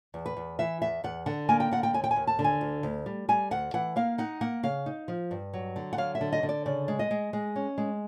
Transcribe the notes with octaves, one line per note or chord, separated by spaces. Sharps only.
E2
B4
E2
E3 E5
E2 E5
E2 F#5
D3 F#5
A#3 G#5
G5
D3 F#5
G5
D#2 G#5
G5
G#5
D#2
A5
D3
G#5
D2
D2
G3
G3 G#5
D2 F#5
E3 F#5
A#3 F5
D#4 F#5
A#3 F#5
C#3 F5
D#4
F3
G2
F#3
D3
F#5
F#3 F5
E5
D3
D#5
D3
D5
C#3 D5
G#3
D#5
G#3
G#3
C#4
G#3